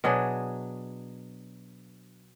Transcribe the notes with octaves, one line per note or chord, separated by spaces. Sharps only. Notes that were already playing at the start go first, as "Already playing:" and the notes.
B2 F#3 D4 G#4